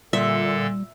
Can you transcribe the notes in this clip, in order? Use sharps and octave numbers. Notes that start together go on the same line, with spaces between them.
A#2 D3 G3 A4 E5